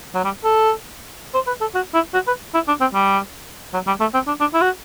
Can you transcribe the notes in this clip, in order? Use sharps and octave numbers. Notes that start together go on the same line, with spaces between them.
F#3
G3
A4
C5
B4
A4
F#4
E4
F#4
B4
E4
D4
C4
G3
F#3
G3
A3
C4
D4
D4
E4
F#4